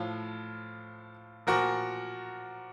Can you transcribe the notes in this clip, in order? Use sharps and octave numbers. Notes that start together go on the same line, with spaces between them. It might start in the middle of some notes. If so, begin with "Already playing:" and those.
Already playing: A2 F3 F4
A#2 F3 F#4 A#4